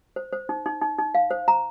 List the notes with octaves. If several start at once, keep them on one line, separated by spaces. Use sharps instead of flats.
C5
C5
D#4
D#4
D#4
D#4
F5
C5
A#5